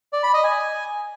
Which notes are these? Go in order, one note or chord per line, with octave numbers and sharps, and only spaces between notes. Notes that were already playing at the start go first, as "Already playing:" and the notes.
D5
B5
D#5
G#5